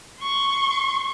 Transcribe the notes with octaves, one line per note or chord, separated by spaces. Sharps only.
C6 C#6